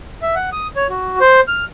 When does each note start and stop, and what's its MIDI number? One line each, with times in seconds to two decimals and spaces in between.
0.22 0.35 76
0.35 0.50 78
0.52 0.67 87
0.76 0.87 73
0.90 1.19 66
1.21 1.40 72
1.48 1.64 89